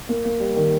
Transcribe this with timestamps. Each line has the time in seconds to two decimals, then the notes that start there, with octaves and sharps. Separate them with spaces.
0.09 A#3
0.25 A#3
0.40 G3
0.56 D#3